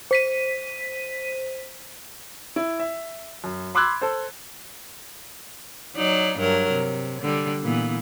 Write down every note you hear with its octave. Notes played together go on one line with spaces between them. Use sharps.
C5 B6 D#7
E4
E5
F#2
B5 C6 D6 E6 F#6 G#6
A4 C5
F#3 D#4 D5
G2 F#3 A#4
C3
D3 G3
A#2 E3 B3